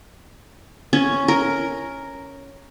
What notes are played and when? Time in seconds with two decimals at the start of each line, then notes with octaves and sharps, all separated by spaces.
0.93 C#4
1.28 A#4